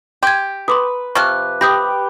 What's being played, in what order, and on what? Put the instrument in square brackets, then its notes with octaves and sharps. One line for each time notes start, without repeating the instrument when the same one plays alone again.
[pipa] G4 [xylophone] C6 G#6
[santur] B4 [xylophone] C6 D6 D#6
[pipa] C3 F3 [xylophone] C#6 F6 [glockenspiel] D6 F#6
[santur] G4 G5 [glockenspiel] B5 [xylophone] D#6 G6 A#6